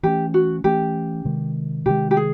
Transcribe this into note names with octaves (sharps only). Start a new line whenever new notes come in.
E3 A3 C#4 G4
F#4
E3 A3 C#4 G4
C3 D#3 G#3
C3 D#3 G#3 G4
G4
G#4